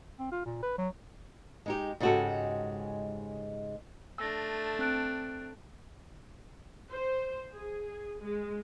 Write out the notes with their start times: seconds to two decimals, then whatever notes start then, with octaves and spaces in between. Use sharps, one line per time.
0.19 C4
0.32 F4
0.45 A#2
0.63 B4
0.78 F#3
1.66 G#3 D#4 G4
2.00 G#2 C#3 G#3 F#4 G4 A4
4.18 A3 D4 E6 A#6
4.79 C4 F#6 D7
6.90 C5
7.54 G#4
8.21 G#3